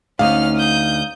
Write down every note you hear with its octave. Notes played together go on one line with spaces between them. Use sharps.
D2 C#4 D#4 F5 F6
D#6 G6